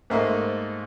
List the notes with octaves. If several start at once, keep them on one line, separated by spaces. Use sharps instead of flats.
G#2 A3 A#3 C5 D#5